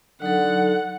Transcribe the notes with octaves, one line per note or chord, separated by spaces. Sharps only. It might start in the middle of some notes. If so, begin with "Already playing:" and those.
D3 F#3 D#4 A4 F#5